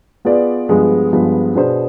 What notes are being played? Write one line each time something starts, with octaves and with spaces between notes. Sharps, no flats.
B3 F4 G#4 B4 D5
G2 F3 G#3 B3
G2 F3 G#3 B3
B2 B3 D4 G#4 C5